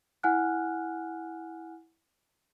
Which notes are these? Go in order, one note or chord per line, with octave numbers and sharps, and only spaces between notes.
E4 F#5 G#5 F6 F#6